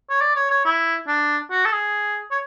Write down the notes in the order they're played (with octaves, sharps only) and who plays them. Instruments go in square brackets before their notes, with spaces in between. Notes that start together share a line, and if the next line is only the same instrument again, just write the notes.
[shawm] C#5
D5
C#5
C#5
E4
D4
F#4
A4
G#4
C#5